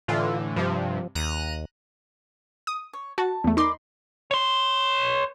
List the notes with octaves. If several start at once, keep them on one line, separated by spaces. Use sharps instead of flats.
A2 D3 E3 F4
G2 C3 F3
D#2 A#5 F#6 D#7
D#6
C#5
F#4 A5
E2 A3
D#4 A#4 D5 B5 C6
C#5 C6